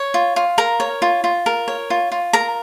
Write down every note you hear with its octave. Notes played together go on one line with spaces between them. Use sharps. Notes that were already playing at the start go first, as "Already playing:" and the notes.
Already playing: C#5
F4
F4
A#4 A#5
C#5
F4
F4
A#4
C#5
F4
F4
A#4 A#5